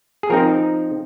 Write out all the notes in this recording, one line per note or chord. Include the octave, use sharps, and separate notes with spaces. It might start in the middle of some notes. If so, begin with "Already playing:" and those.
G#4
F3 C4 D#4 A#4